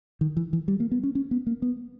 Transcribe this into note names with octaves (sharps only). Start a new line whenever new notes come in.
D#3
E3
E3
G3
A#3
B3
C#4
C#4
B3
A#3
B3